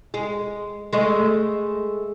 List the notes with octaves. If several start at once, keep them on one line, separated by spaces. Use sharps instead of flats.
G#3
G#3 A3 D#5